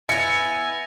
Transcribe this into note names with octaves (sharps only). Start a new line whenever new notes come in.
B3 E4 G#5 A6 A#6 C#7 F7